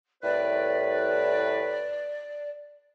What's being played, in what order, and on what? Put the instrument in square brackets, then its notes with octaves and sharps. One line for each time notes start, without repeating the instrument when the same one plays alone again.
[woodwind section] C2 A2 B4 [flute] D5